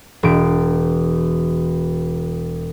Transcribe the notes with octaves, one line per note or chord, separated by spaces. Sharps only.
E1 B2 D7